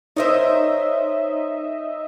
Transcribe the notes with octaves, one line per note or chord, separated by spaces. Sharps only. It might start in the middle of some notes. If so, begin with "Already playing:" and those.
C#4 D#4 A#4 C5 D#5 E5